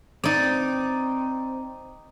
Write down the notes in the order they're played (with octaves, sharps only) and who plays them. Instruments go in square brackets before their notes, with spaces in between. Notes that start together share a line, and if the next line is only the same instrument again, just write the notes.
[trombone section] C4 [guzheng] D#4 D5